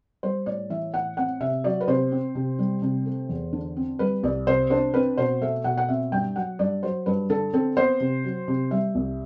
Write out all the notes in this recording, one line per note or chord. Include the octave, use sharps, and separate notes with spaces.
G3 C5
A2 D5
E3 E5
A2 F#5
C4 F#5
C3 E5
F#3 D5
B4
C3 C5
C4
C3
G3
C3
A3
E2
D3
C4
G3 B4
C2 D5
C3 C5
D4 C5
C4 B4
B2 C5
A3 E5
B2 F#5
F#5
C4 E5
G2 G5
F#3 F#5
G2 D5
F#3 C5
G2 B4
D3 A4
C4 A4
B3 C5
C3
F#3
C3
G3 E5
C2